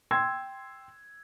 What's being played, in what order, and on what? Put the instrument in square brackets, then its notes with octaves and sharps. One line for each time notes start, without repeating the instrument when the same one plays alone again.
[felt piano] G5 C6 E6 G#6